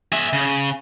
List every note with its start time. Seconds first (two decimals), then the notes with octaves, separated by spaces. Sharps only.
0.12 G#4 E5
0.33 C#3